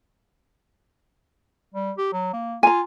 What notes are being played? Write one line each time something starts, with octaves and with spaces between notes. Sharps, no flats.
G3
G4
F#3
A#3
F4 G#5 A#5